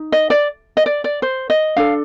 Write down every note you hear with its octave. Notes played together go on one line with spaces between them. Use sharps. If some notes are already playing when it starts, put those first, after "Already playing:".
Already playing: D#4
D#5
D5
D#5
D5
D5
C5
D#5
D4 A4 F5